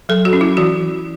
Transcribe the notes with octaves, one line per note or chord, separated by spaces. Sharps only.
F#3 A4
F#4
C#4
E4
E3 F#4